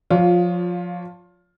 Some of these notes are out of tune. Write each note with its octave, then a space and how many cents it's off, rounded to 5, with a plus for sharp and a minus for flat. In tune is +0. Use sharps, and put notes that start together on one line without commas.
F3 +25 F4 +10 C#5 +40